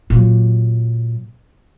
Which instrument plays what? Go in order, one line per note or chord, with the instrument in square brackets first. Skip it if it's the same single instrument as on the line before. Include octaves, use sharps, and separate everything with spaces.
[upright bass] A#2 F#3